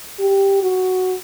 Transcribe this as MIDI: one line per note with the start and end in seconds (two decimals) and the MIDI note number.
0.19 0.58 67
0.62 1.17 66